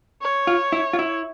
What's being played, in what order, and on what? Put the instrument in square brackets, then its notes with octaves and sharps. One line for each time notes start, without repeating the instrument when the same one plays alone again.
[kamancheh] C#5
[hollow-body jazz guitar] F4
E4
F4
E4